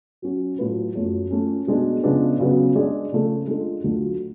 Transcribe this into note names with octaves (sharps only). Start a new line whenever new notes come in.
F#3 C#4 F#4
A2 F#3 A3 F4 B4
F#2 F3 A3
F3 A3 C#4
B2 G#3 D4 G#4
C#3 F3 G#3 B3 D4
C#3 F#3 B3
G#3 D4 G#4 D5
C#3 F3 A3 F4 A4
G#3 D4 F4 A4
D2 D3 F#3 A3 F4